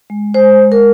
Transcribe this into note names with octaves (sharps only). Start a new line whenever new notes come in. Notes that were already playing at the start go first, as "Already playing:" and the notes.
G#3
G#3 C5
G#3
A#4